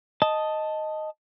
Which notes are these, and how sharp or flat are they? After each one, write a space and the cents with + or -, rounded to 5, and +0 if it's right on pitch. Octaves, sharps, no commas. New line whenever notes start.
D#5 +0 A5 +0